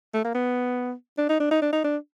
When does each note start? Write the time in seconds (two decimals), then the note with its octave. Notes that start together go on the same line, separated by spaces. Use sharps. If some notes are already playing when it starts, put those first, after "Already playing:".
0.14 A3
0.24 A#3
0.34 B3
1.18 D4
1.29 D#4
1.40 D4
1.51 D#4
1.62 D4
1.72 D#4
1.84 D4